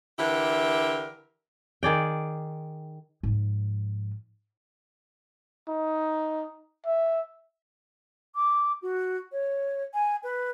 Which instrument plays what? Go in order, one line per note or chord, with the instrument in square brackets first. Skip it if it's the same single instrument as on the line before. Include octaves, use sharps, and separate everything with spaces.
[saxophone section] D3 E3 E4 G4 A#4
[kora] D#3 G#4 D5 G5
[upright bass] G#2 F3
[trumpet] D#4
E5
[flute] D6
F#4
C#5
G#5
B4